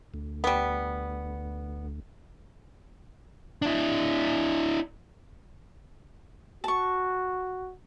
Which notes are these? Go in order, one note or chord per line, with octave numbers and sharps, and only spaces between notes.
D2
G3 B3
D4 E4
F#4 A5 C#6